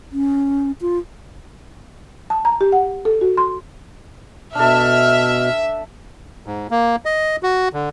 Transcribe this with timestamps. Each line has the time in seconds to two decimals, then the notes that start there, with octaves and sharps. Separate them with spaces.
0.12 C#4
0.81 F4
2.30 A5
2.45 A#5
2.61 G4
2.72 F#5
3.05 A4
3.21 F#4
3.37 C6
4.55 B2 D4 A4 E5 F6
6.46 G#2
6.71 A#3
7.05 D#5
7.43 F#4
7.73 D3